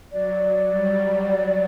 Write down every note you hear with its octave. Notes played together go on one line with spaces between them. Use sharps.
F#3 D5
G3
F#3